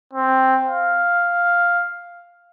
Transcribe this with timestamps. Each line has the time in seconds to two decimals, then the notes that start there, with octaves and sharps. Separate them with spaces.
0.13 C4
0.67 F5